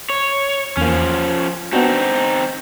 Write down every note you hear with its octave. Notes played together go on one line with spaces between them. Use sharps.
C#5
E2 F3 A#3 C#4
B3 C4 D4 D#4 F#4